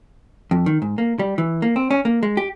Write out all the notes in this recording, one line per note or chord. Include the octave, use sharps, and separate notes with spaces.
F2
D#3
G#2
A#3
G3
E3
A#3
C4
C#4
A#3
G#3
G4